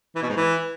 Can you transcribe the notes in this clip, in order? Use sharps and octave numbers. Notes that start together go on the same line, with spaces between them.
E3
B2
G#2
E3